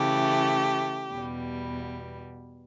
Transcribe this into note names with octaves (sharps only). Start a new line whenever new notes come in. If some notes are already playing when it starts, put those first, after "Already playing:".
Already playing: C#3 E3 A3 G4
E2 B2 G3